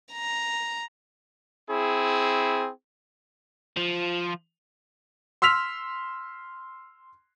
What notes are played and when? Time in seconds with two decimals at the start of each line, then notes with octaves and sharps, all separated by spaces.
0.12 A#5
1.69 C4 E4 G#4
3.77 F3
5.42 C6 E6 F6 B6 F7